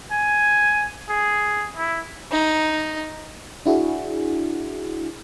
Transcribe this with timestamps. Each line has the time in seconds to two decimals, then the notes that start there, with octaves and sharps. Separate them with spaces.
0.11 G#5
1.09 G#4
1.77 E4
2.32 D#4
3.66 D4 E4 F#4 G#4